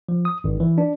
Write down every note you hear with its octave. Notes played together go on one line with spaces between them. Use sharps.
F3
D#6
G#1
E3
D4